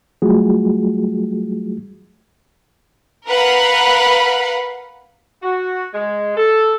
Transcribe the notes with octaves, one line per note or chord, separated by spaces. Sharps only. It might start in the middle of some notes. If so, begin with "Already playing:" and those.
F#3 G3 A3 F4 F#4 G#4
A#4 B4 F5 F#5 B5
F#4
G#3
A4